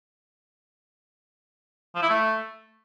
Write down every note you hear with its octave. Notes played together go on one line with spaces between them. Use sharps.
F3
E4
A3